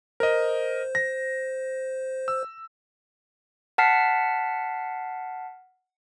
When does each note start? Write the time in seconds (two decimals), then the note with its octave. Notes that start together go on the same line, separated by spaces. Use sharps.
0.20 A#4 C5 D#5
0.95 A#6
2.28 E6
3.78 F#5 A5 F6 B6 C7